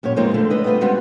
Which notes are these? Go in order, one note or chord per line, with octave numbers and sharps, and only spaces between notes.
F#2 A#2 G4 C#5
E2 F3 G#3 A#3 C4 D#4
D3 A3
A3 D4 B4 D#5
G3 B3 C4 F4 B4
G3 G#3 B3 C4 F#4